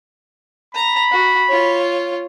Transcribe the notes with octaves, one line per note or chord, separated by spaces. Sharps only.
A#5 B5
F#4
F4 C#5